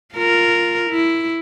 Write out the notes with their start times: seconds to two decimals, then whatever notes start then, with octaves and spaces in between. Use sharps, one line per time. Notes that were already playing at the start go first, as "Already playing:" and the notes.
0.15 F4 A#4
0.91 E4